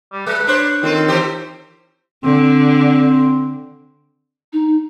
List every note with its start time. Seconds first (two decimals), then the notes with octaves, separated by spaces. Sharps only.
0.13 G3
0.26 G#3 B4
0.47 D4 C5 C#5
0.83 D#3 C4 F4 A4
1.08 E3 G4 C5
2.24 D3 C4
4.53 D#4